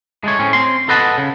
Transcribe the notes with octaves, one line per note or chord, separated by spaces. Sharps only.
G#3 A3 C#5
A2 C4 C#4
C4 C6
A4 B4 D#5 F#5 A5
C#3